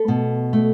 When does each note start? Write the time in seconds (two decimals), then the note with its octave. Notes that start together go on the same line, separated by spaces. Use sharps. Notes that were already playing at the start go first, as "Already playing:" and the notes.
Already playing: A3 A4
0.08 B2
0.53 A3